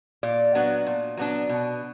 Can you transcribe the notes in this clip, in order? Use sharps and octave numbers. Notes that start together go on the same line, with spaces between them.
A#2 D5
F#3 B3 D4
A#2
F#3 B3 D4
B2